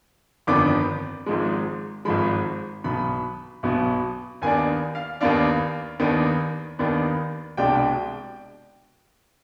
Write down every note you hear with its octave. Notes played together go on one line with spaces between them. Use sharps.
G1 F2 D#3 B3 D4 D6
G#1 G#2 F3 G#3
G#1 G#2 F3 G#3 B5
B1 B2 B3 B5
B1 B2 B3
D#2 D#3 B3 D4 G#5
F5
D#2 D#3 B3 D4 F5
D#2 D#3 B3 D4
D#2 D#3 B3 D4
C2 B2 G#3 D4 G5